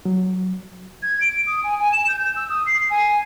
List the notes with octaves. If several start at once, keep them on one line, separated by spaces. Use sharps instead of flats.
F#3
G#6
D7
D#6
G#5
G#5
E7
G6
G6
E6
D#6
C7
G#5